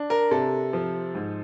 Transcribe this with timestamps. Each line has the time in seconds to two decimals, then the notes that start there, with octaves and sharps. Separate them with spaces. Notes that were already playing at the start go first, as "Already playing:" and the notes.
Already playing: D4
0.10 A#4
0.31 C3 A4
0.73 F3
1.15 G#2